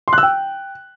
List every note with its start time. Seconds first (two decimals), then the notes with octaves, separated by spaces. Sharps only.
0.08 C6
0.13 F#6
0.18 E6
0.23 G5